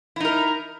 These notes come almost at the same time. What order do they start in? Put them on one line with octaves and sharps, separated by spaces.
E4 D#4 A#4